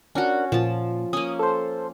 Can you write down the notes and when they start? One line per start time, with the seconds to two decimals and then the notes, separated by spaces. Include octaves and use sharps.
0.15 C#4 D4 F#4 A#4 F#5
0.52 A#2 F3 A5
1.13 A#3 C#4 D#6
1.39 A4 C5